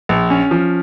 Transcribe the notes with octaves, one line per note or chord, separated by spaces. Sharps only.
A#1
C#4
F3